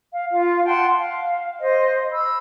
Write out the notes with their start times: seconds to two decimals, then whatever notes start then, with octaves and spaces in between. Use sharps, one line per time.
0.12 F5
0.31 F4 F5
0.65 F#5 G5 A5 C6
0.95 F5
1.60 C5 D#5
2.12 B5 E6